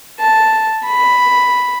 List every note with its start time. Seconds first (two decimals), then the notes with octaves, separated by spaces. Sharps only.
0.20 A5
0.86 B5